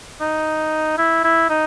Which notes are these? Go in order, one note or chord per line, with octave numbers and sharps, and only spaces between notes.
D#4
E4
E4
D#4